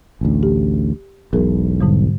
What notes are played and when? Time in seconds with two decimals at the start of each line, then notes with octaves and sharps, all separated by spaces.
0.21 A1 D2
0.43 G4
1.33 E1 B1 F#3 G#4 A#4
1.81 G#2 D3 G3